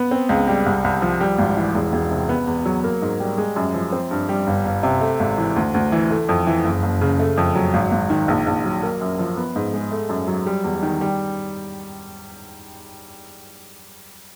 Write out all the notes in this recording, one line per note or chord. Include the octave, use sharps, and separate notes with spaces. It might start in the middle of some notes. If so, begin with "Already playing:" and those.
Already playing: B3
C4
C#2
G3
C2
C2
F3
G3
G#1
E3
E1
E1
C3
B3
E2
F#3
A#3
G#2
G3
G#3
F#2
F3
C4
G2
G3
G1
G1
C3
A3
G#1
E3
D2
D2
E3
A3
F2
E3
F#1
F#1
C#3
A3
F2
F#3
G#1
G#1
D#3
A#1
A#1
F#3
A#3
F#2
F3
B3
G#2
G#3
A3
F#2
F#3
G3
E2
D#3
G3